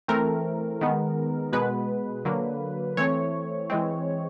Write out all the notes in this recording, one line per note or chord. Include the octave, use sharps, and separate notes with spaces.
E3 A3 C4 A#4
D#3 G#3 B3
B2 G#3 B3 B4
D3 F#3 A#3
E3 A3 C4 C#5
E3 G#3 C4